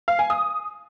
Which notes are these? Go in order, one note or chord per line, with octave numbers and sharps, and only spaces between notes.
F5
G#5
D#6